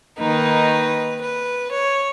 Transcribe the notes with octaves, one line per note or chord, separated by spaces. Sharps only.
D#3 A#3 D#4 B4
B4
C#5